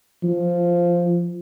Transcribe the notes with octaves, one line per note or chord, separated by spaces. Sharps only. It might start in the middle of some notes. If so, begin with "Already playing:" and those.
F3